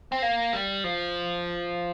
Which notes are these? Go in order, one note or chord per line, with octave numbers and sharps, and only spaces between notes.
C4
A#3
G3
F3